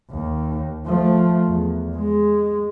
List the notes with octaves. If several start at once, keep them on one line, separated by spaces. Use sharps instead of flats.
D#2
F3 A3
E2
G#3